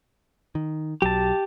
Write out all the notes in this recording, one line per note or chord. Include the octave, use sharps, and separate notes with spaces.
D#3
B1 F#3 G4 A5